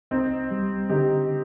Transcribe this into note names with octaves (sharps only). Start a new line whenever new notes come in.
C2 C4 D#4
G3
D3 D#4 G4